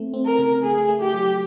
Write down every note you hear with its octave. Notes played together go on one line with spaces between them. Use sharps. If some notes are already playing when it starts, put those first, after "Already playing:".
Already playing: A3 C4
C4
A#4
C#3
A3 G#4
A3
G4
F#3